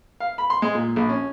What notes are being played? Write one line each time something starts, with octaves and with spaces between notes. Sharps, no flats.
F5
B5
C6
G#3
A#2
A#1
C#4